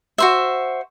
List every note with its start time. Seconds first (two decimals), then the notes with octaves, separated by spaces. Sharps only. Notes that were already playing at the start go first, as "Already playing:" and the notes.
0.18 F#4 C5 E5